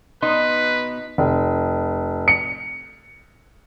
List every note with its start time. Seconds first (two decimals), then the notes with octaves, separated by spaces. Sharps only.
0.22 B2 B3 D#4 B4 C6
1.18 F1
2.28 C#7